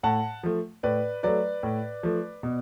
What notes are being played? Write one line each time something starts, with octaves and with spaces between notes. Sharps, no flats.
A2 F#5 A5
F3 A3
A2 B4 D5
F#3 A3 B4 D5
A2
F3 A3
B2